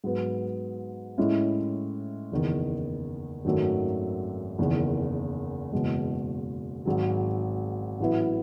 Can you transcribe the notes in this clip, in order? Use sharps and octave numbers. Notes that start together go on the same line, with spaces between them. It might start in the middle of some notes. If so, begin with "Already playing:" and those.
G#2 F#3 B3
A2 G#3 C#4 E4
F#1 E2 D#3
G#1 F#2 D#3 F#3 A3
F#1 E2 D#3
F#1 E2 B2 G#3
G#1 G#2 F#3
A1 A2 F#3 B3 E4